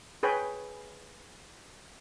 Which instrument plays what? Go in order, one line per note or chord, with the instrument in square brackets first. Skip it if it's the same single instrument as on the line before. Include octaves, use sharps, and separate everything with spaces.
[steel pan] G#4 B4 C#5 G5 G#5